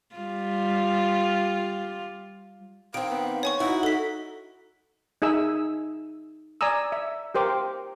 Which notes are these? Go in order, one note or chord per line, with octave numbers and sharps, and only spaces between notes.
G3 F4
D#3 C4 F5 D7
B3
C#5 G#5 C#6
D#4 E4 F#4
A4 B6
D#4 G#4 E5 E6
D5 G#5 A#5 D#6 E6
E5
G4 A#4 C5 G5 D6